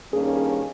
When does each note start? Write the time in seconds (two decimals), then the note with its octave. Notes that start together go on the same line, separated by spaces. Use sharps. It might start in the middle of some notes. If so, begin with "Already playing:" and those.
0.13 G2 D#3 A#3 C#4 G#4
0.36 G#4